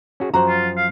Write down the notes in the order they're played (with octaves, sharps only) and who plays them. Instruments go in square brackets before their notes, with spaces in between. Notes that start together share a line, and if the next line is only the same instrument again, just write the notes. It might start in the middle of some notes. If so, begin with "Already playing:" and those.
[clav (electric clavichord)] C#4 F#4 G#4
[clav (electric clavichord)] F#2 F3 C5 [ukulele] F#4 A#5
[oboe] F4
F5